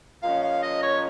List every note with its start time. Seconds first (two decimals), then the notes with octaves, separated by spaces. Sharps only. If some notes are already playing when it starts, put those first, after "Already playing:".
0.23 A#2 F3 G#3 C#4 F5
0.43 F5
0.63 D#5
0.83 C#5